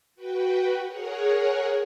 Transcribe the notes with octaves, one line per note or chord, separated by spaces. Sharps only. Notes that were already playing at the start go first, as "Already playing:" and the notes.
F#4 B4 G5
G#4 A#4 C#5 F#5